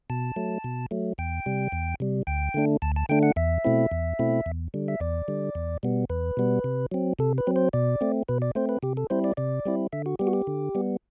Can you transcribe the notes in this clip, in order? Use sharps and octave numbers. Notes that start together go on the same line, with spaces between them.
B2 A5
F#3 A3
B2
F#3 A3
E2 G5
C3 G3
E2
C3 G3
D2 G5
D3 A3 D4
D2 A5
A5
D3 A3 D4 G5
F#5
E2 E5
B2 A3 C4 E4
E2
B2 A3 C4 E4
E2
D3 G3
E5
E2 D5
D3 G3
E2
B2 G3 B3
E2 B4
B2 G3 B3
C3
F#3 C4
C3 A4
B4
F#3 C4
C5
B2 D5
A3 C4
B2 B4
D5
A3 C4 C5
B4
C3 G4
A4
G3 C4 E4 C5
D5
C3 D5
G3 C4 E4
D3 E5
F#4
G3 B3 G4
F#4
G4
D3
G3 B3